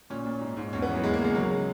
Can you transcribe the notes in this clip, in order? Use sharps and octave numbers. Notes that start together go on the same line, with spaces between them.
A#2 C#4
A#2
G#2
G#2
E2 C#4
B3
E3
F#3
E2 G#3
A#3
C#3 G#3
C#3 F#3
G#3